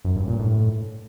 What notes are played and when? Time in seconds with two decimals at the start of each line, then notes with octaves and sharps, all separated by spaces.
0.05 F#2
0.16 G2
0.28 A#2
0.39 A2